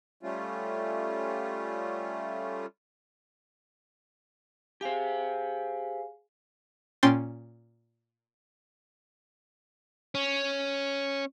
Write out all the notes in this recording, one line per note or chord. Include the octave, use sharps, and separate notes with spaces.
G3 A3 C#4 F4
G4 G#4 C5 F5 G#5
A#2 C#4 G5 C6 A6
C#4